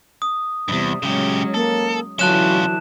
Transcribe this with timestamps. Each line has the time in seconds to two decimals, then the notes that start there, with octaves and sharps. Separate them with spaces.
0.22 D#6
0.68 E2 G2 C3 G3
1.03 C#3 F#3 G#3 C#4 G4
1.54 A#3 A4
2.19 D3 E3 F#3 C#4 F4 A5 F#6 E7